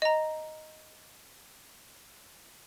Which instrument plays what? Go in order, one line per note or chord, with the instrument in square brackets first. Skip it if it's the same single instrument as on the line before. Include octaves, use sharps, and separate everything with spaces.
[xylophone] D#5 A#5